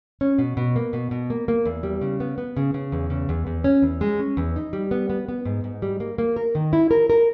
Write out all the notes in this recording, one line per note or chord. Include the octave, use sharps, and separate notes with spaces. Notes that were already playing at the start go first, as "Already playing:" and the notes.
C#4
B2
B2
A#3
B2
B2
A#3
A#3
E2
G3
C#3
B3
B3
C#3
C#3
E2
C#3
E2
E2
C#4
E2
G#3
C#4
E2
D#4
G3
B3
B3
B3
G#2
G#2
G3
A#3
A#3
A#4
D#3
E4
A#4
A#4